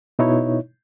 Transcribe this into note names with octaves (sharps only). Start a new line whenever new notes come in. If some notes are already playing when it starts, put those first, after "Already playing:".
B2 D#4 E4 C#5